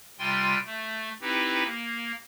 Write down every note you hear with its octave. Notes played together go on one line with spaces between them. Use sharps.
C3 G3 F4 G5 G#5 C6
A3
C4 D#4 E4 G4 B4
A#3